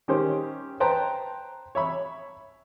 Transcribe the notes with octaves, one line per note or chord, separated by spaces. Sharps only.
D#3 C#4 G4 C5
B4 C5 G5 A5 A#5
C#5 E5 B5